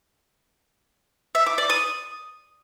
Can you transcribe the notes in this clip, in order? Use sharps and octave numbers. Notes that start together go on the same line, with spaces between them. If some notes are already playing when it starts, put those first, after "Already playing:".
E5
D6
D5
D#6